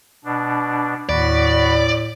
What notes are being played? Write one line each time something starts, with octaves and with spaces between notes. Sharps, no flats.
B2 D4
D#2 A2 F#4 D5 B5